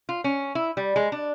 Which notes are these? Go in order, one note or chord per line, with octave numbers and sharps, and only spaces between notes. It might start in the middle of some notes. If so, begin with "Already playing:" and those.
F4
C#4
E4
G3
G#3
D4